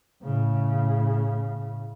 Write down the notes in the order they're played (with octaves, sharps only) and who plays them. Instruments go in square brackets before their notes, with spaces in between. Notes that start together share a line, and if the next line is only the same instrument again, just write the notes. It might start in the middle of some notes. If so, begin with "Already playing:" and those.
[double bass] A2 C#3